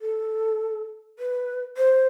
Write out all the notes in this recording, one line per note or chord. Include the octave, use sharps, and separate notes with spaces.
A4
B4
C5